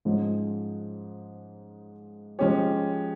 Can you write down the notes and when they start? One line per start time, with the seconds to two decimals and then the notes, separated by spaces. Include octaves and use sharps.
0.05 G#2 F3 G#3 C#4
2.39 F3 G#3 C#4 G4 C#5